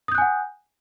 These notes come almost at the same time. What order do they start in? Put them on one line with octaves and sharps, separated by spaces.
D#6 G6 F#6 G#5 F#5